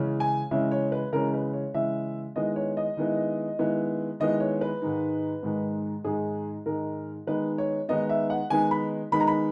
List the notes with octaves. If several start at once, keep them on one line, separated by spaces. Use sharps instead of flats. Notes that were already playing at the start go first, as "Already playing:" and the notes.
Already playing: C#3 E3 G#3 C#4
G#5
C#3 E3 G#3 C#4 E5
C#5
B4
C#3 E3 G#3 C#4 A#4
B4
C#5
C#3 E3 G#3 C#4 E5
D#3 G#3 B3 E4 D#5
C#5
D#5
D#3 G#3 B3 E4
D#3 G#3 B3 E4
D#3 G#3 B3 E4 D#5
C#5
B4
G#2 D#3 G#3 D#4
G#2 D#3 G#3 D#4
G#2 D#3 G#3 D#4 G#4
G#2 D#3 G#3 D#4 A#4
D#3 G#3 B3 D#4 B4
C#5
D#3 G#3 B3 D#4 D#5
E5
F#5
D#3 G#3 B3 D#4 G#5
B5
D#3 G#3 B3 D#4 B5
A#5
B5